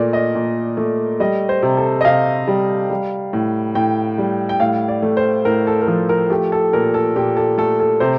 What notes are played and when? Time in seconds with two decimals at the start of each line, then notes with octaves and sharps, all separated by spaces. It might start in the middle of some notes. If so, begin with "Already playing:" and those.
Already playing: A#2 A3 A#4 D5
0.13 D#5
0.35 A#2
0.77 A3
1.20 G3 D#5
1.49 C5
1.62 C3
1.77 A4
2.01 D#5
2.05 C3 F5
2.48 G3
2.90 G3
3.33 A2
3.75 A2 G5
4.18 G3
4.49 G5
4.60 A2 F5
4.88 D5
5.02 A3
5.17 C5
5.45 A2 A#4
5.67 A4
5.82 A#4
5.88 F3 A4
6.09 A#4
6.30 A3 G4
6.52 A4
6.73 A#2 A#4
6.94 A4
7.16 A#2 G4
7.37 A4
7.58 A3 A4
7.80 A4
8.00 C3 C5